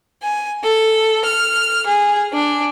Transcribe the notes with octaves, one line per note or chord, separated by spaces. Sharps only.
G#5
A4
F6
G#4
D4